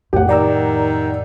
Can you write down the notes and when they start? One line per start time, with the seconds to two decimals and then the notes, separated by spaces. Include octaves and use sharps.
0.13 F2 A2 G4 F#5
0.29 D#3 D5 A#5 E6